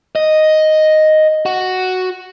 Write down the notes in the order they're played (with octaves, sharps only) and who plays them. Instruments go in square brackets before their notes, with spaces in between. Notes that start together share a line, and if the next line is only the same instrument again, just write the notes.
[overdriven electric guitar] D#5
F#4